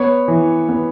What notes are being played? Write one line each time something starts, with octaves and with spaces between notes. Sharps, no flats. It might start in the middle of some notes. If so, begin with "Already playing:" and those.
Already playing: B3 C#5
E3
B3